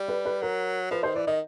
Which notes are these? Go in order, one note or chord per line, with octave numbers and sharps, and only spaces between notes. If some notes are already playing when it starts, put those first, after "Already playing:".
Already playing: G3
B4
B4
F#3 A#4
F3 B4
D#3 C5
E3 D5
D#3 D#5